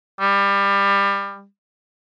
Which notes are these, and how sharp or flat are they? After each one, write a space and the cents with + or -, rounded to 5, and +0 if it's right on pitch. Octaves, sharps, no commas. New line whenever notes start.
G3 +25